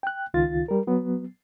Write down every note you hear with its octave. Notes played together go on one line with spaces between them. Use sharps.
G5 F#6
C#2 D#3 F4 A6
G3 A#4
F#3 B3